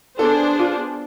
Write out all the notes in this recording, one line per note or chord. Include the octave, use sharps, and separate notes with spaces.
B3 D4 G#4 A4 C5
F4